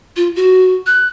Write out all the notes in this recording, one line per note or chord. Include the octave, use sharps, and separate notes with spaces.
F4
F#4
F#6